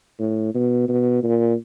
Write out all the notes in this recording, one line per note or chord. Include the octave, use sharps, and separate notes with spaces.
A2
B2
B2
A#2